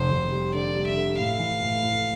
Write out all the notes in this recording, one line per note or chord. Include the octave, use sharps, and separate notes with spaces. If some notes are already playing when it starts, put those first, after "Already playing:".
Already playing: F1 C5
F1
G3
D3 D5
G3
E5
D3
A2 F5
E3
A2
A2